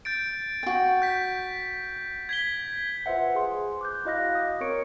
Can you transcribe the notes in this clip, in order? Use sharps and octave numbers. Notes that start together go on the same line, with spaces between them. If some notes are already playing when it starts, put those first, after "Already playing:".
G6 A6 D7
F#4 G5
G6 B6
G#6 B6 G7
F4 B4 C5 E5 F#5
G#4 C5 C6
D6 F#6 G6
E4 F#4 D#5 F5 F#6 A#6
D#6
C4 A#4 C#5 C#6 C#7 D7